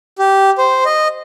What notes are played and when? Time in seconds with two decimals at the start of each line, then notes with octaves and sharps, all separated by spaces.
0.19 G4
0.58 C5
0.85 D#5